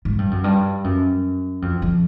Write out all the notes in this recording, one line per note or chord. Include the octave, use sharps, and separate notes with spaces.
G#2
G2
F#2
G2
F#2
F2
F2